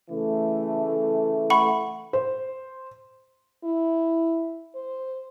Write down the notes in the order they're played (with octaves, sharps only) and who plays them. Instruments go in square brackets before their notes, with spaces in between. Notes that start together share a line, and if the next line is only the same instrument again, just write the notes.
[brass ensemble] C#3 E3 A3
[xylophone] F#5 B5 C#6
[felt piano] C5
[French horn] E4
C5